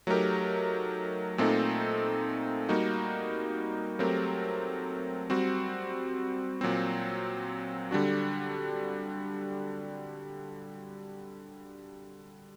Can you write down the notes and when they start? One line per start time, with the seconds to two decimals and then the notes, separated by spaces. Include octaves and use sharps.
0.07 F#3 A3 D#4 G4 A#4
1.38 A#2 A3 C4 D#4 A4
2.69 G3 A#3 D#4 F#4
3.99 F#3 A3 C4 G4 A#4
5.30 G3 C4 F#4
6.61 A#2 F#3 C4
7.91 D3 G3 D4 F#4